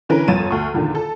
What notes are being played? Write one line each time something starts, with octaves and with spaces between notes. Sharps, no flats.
D3 E3 C#4 A#4 B4
G1 F2 C#5 A6 D#7 E7
D2 C#6
E2 A#2 D3 D#3
A4